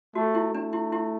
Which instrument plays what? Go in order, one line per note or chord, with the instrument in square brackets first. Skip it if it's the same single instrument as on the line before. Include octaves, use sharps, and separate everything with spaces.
[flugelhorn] A3 [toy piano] F#4
[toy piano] E4
[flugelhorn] A3 [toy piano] D4
[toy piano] E4
E4